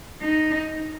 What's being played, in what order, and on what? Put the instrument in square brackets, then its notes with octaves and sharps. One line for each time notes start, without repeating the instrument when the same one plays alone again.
[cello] D#4